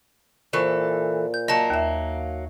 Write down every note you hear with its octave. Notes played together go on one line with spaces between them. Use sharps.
A#2 E3 A4 C5 C#6
G6
F#3 A#3 D#5 A5
D#2 E5